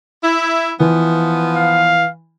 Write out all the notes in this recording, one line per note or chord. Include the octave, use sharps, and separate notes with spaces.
E4
E3 F3 B3
F5